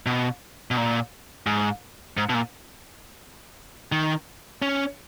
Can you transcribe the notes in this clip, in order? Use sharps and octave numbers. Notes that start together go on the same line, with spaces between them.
B2
B2
A#2
G#2
G#2
B2
A#2
D#3
C#4